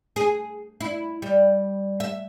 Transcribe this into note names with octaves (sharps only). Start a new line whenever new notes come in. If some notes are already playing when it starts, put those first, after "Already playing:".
G#4
E4
G3
E5